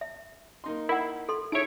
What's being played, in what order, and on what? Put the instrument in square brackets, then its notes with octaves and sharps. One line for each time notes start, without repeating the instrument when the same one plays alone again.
[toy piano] E5
[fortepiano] A#3 D#4 C6
[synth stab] E4 [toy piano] A#4 F#5
[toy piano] A4 C6
[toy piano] D#4 [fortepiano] E4 G#4 E5 [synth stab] C#5 D7